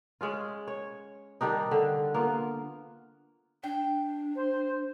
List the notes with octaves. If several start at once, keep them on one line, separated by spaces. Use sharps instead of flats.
G#3 C#4 F4
C#5
D#3 G3 D4 D#4
D3
A#3 B3 F4
D4 G5
C5